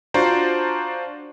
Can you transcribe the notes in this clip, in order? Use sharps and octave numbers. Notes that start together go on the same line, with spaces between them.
D4 F4 F#4 C5 D5 A#5